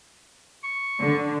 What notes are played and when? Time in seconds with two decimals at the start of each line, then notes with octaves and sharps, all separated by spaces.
0.64 C#6
1.00 D3